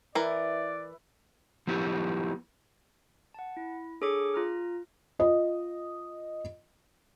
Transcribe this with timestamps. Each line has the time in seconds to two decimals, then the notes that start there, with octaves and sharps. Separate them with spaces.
0.15 E3 E4 A#4 B4 D5
1.67 F3 B3 E4 G4
3.34 F#5 A5
3.57 E4
4.01 D4 G#4 A4 C#5 D6 C#7
4.34 F4 A#5 F6
5.19 F4 D#5